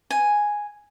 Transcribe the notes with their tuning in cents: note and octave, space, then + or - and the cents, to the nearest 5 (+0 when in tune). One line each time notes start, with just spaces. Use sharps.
G#5 +0